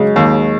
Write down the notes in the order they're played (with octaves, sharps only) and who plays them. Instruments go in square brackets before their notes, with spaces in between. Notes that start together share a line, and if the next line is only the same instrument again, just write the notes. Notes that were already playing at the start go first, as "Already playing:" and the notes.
Already playing: [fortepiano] C#3 [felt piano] F#3 G#3
[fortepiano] D#2